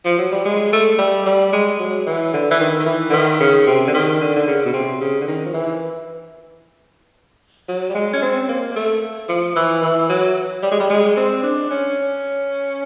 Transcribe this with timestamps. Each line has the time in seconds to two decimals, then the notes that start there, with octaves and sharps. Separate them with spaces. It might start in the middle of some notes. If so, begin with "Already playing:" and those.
0.05 F3
0.18 F#3
0.31 G3
0.45 G#3
0.73 A3
0.98 G3
1.26 G3
1.53 G#3
1.79 F#3
2.06 E3
2.33 D3
2.51 E3
2.60 D#3
2.79 D#3
2.86 E3
3.10 D3
3.13 D#3
3.40 C#3
3.67 C3
3.87 D3
3.94 D#3
4.21 D3
4.36 D3
4.47 C#3
4.65 B2
4.73 C3
5.01 C#3
5.21 D3
5.27 D#3
5.45 F3
5.54 E3
7.68 F#3
7.89 G3
7.95 G#3
8.13 C#4
8.22 C4
8.49 A#3
8.71 A#3
8.76 A3
9.28 F3
9.56 E3
9.83 E3
10.09 F#3
10.63 G3
10.71 G#3
10.80 G3
10.90 G#3
11.17 C4
11.43 D4
11.70 C#4